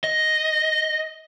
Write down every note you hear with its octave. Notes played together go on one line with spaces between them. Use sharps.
D#5